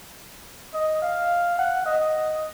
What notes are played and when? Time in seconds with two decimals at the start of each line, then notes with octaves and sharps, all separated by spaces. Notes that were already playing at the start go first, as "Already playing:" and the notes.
0.74 D#5
1.02 F5
1.59 F#5
1.86 D#5